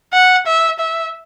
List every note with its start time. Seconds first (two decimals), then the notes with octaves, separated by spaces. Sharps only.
0.13 F#5
0.46 E5
0.80 E5